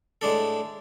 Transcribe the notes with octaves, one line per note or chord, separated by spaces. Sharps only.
A2 G#3 D4 A4